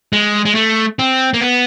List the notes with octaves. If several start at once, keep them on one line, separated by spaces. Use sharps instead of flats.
G#3
G#3
A3
C4
A#3
B3